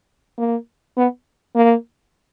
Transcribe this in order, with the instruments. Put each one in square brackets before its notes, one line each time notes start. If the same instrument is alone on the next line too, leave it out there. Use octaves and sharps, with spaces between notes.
[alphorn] A#3
B3
A#3